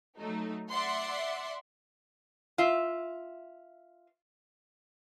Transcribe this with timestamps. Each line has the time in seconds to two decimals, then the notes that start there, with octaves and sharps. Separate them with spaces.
0.18 F#3 A3 D#4
0.71 D5 E5 F#5 C6
2.58 F4 E5